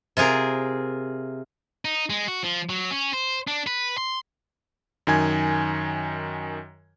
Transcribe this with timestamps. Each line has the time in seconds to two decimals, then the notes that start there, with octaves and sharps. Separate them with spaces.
0.17 C3 F4 G#4 A#4
1.85 D#4
2.10 G#3
2.28 F#4
2.44 F3
2.69 F#3
2.91 C#4
3.13 C5
3.48 D4
3.67 B4
3.98 C6
5.07 F#2 D#3 G#5 G#6